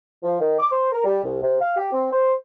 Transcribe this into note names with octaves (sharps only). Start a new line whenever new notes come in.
F3
D#3
D6
C5
A#4
G3
C2
C3
F5
G4
C4
C5